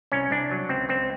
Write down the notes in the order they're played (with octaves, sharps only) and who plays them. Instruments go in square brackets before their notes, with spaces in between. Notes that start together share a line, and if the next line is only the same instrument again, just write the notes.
[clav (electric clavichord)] C2 C#4
C2 D4
F#3
C#2 C4
C#2 C4